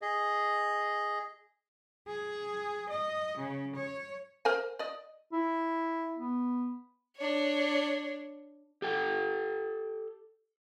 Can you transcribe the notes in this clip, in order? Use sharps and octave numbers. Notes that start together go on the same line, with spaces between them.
G#4 D#5
G#4
D#5
C#3
C#5
A#4 C5 G#5
D5 D#5
E4
B3
D4 C#5
G4 A4 G5